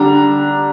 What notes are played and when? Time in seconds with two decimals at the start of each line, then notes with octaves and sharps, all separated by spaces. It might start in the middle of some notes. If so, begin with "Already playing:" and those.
Already playing: D3 G3 D4 A#5